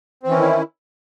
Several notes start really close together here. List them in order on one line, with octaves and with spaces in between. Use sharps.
C4 E3 C#4 D#3 E4